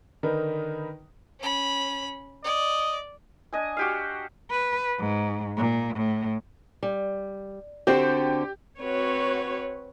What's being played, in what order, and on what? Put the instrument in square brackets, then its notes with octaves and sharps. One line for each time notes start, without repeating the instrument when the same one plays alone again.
[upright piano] D3 D#3 D#4 A#4 B4
[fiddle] C#4 B5
[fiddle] D5 [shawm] D#5
[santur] D4 D#5 G#5
F#4 G4 F5
[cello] B4
G#2
A#2
A2
[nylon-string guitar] G3
[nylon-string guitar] D3 C4 F#4 [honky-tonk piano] G4
[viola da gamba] C4 B4 [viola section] F#4 C#5